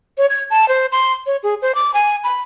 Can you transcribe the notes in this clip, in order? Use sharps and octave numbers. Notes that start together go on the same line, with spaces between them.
C#5
G#6
A5
C5
C6
C#5
G#4
C5
D6
G#5
B5